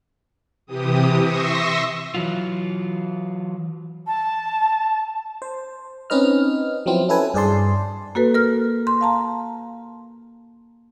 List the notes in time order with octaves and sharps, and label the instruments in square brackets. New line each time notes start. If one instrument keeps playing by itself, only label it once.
[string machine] C3 E3 G4 D#6
E5 C6 C#6 D#6 E6 A#6
[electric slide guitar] E3 F#3 F4
[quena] A5
[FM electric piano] C5
C4 C#4 D#4 B4 D#5 F6
F3 F#3 B3 C4 E4
C#4 E4 A4 B4 G#5
G2 G#4 D5 A5 C6
[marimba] A#3 F#4 A4 B4
A#4 F6
C6
F5 A5 A#5